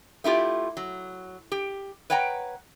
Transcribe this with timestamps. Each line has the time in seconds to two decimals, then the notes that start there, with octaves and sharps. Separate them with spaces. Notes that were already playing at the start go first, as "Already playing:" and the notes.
0.24 A3 E4 F4 G4
0.77 F#3
1.52 G4
2.10 B4 C#5 F#5 G5 A#5